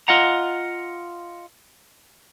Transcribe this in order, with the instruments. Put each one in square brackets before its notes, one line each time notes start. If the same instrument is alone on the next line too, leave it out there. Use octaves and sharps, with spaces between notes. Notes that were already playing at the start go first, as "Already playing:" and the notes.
[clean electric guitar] F4 D#5 F#5 A#5